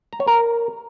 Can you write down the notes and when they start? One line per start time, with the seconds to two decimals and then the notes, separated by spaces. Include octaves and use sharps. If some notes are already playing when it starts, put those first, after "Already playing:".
0.13 A#5
0.20 C#5
0.28 A#4